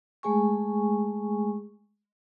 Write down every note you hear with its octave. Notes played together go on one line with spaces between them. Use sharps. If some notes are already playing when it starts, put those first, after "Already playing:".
G#3 A3 G#4 G#5 C#6